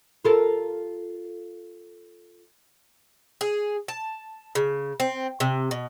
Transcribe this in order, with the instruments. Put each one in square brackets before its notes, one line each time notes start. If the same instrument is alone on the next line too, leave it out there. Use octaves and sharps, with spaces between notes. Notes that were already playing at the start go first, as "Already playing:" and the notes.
[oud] F4 A4 A#4
[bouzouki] G#4
A5
C#3
C4
C3
B2